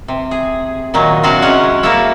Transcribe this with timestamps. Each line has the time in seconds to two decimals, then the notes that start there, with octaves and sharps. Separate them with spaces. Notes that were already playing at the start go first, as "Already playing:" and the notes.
0.08 C3
0.31 G#4
0.94 A#2 D#3 F#3 D#4
1.23 C3 F#3 D4 F#4 F5
1.42 G#3 C#4 C#5 F#5
1.83 A#3 E4 F#4 A4 C#5 E5